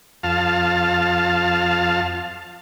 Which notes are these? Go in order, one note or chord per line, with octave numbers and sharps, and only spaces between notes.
F2 F5 A5